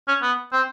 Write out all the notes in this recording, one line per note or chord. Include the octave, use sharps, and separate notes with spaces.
C#4
B3
C4